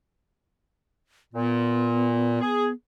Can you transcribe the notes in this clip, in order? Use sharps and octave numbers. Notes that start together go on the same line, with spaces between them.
A#2 B3
G#4